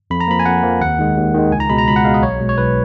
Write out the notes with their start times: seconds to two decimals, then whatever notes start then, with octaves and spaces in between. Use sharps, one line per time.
0.10 F2 B5
0.20 A#5
0.28 F3 A#3 B5
0.39 G#5
0.46 F2 F#5
0.63 F3 A#3
0.81 D#2 F#5
0.99 D#3 G#3
1.16 D#2
1.34 D#3 G#3
1.52 C#2 G#5
1.60 A#5
1.69 B2 G#3 B5
1.78 A#5
1.87 C#2 B5
1.96 F#5
2.05 B2 G#3 F5
2.14 D#5
2.22 B1 C#5
2.40 B2 G#3
2.49 C#5
2.58 B1 B4